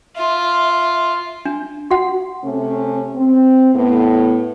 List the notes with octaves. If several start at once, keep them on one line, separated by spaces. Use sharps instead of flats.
F4 E5
D4
F#4 F#5
C3 A3 C#4
C4
A2 B3